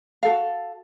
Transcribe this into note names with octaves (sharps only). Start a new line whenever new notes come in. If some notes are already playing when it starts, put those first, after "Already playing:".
F#4 A4 F5